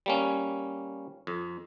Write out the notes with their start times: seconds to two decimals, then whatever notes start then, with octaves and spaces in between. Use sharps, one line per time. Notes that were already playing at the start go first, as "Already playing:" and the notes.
0.06 G3 A#3 C#4
1.27 F2